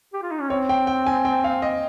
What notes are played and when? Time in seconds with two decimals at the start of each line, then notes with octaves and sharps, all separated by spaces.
0.13 G4
0.23 F4
0.31 D#4
0.41 C#4
0.49 C4 C#5
0.69 G5
0.87 G5
1.06 G#5
1.25 G5
1.44 F5
1.62 D#5